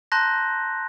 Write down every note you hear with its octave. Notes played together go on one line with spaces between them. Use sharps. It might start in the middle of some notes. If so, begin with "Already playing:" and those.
A5 A#5 C6 F#6 G6 A#6